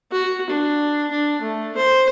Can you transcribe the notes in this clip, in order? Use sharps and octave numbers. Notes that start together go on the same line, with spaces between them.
F#4
D4
D4
A3
C5